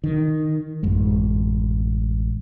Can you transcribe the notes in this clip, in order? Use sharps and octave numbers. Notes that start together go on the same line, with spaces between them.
D#3
A1 F#2 G#3